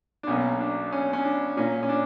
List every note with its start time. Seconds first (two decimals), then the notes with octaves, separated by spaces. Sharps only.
0.23 D4
0.27 B1 B2 A#3 C#4
0.60 D4
0.92 C#4
1.13 C#4
1.24 D4
1.57 A#2 A#3 C#4
1.83 C#4
1.89 D4